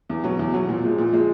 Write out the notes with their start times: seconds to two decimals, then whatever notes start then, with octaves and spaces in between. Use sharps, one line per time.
0.09 E2
0.24 B2 F#3
0.39 E2
0.54 B2 F#3
0.69 A#2
0.83 F3 G#3
0.98 A#2
1.13 F3 G#3